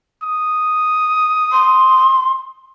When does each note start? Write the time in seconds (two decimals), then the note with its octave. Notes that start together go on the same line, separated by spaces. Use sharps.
0.23 D#6
1.52 C6